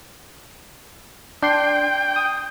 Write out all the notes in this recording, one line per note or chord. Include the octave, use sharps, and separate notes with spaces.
D4 G5 C6
D#6